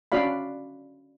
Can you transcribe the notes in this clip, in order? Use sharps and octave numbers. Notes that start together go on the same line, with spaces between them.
C#4 D4 F#4 D5 F5 B5